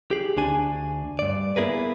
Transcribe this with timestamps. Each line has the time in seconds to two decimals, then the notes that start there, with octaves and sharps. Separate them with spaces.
0.11 G4 G#4
0.37 D2 D4 G#5
1.19 G2 D5
1.56 A#3 B3 E4 G#4 A#4 B4